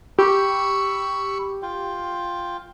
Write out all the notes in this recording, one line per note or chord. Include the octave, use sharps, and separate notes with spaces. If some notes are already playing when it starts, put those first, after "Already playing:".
G4 B5 C#6 E6
F4 G5